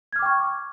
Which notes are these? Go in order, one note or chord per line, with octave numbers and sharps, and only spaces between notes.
G5 C#6 D6 F6 G#6